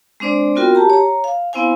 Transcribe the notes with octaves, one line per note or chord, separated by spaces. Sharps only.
G#3 C4 D4 C5 D5
B3 C4 F4 F#4 A#4 G5
G4 A5 A#5
C#5 A#5
F5
B3 C4 E4 C5 F5 G#5